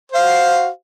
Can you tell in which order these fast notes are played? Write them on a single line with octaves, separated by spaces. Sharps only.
C5 F5 F#4